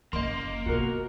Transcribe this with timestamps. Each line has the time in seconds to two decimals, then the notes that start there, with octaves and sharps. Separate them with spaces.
0.13 F#1 A#3 D#5 C6
0.66 B2 F#4 A#4